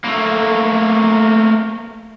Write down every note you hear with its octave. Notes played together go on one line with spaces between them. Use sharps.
A3 A#3